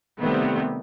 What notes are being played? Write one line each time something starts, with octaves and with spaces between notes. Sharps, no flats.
C3 D#3 G3 A3 B3 C4